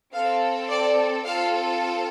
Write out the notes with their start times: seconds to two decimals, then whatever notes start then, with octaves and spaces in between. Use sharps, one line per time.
0.14 C4 A4 F5
0.70 D5
1.26 C4 F4 A4 F5